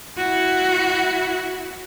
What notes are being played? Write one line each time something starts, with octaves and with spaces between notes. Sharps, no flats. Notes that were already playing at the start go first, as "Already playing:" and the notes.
E4 F#4